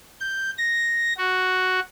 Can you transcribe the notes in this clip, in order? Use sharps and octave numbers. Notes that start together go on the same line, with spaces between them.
G6
A#6
F#4